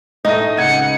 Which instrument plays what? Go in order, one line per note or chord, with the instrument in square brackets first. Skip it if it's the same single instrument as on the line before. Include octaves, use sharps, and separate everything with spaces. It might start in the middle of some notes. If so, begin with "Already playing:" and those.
[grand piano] A2 A3 D#5 [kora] D#4
[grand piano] C#2 G#6 D#7 [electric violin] F#5 C#7